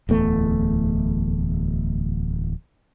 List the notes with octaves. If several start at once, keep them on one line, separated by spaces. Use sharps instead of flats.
D1 E2 A3